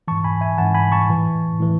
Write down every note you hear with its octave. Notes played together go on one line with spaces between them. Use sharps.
G#2 E3 A5 C#6
G#5 B5
E5 G#5
G#2 E3 F#5 A5
G#5 B5
A5 C#6
A2 E3
A2 E3